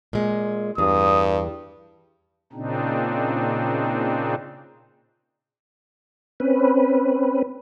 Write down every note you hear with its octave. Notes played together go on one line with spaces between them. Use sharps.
A#2 G#3
E2 G2 D#6
A#2 C#3 C4 D4 D#4
C4 C#4 B4